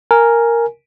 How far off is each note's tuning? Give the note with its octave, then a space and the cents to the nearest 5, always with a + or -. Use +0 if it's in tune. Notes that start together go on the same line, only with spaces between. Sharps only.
A#4 +0 G#5 +0